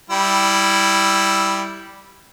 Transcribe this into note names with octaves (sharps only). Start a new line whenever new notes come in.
G3 E4